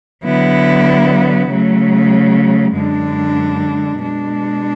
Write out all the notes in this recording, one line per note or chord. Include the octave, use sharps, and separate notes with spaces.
D3 F#3 B3 E4
C#3 F#3 A3
F#2 D3 G#3 D4
B2 G#3 D4